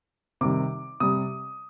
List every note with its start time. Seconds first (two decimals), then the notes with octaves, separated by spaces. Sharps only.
0.41 C3 D#3 G3 D6
1.00 C3 G3 D#6